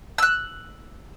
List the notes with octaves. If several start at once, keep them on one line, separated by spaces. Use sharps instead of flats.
E6 F#6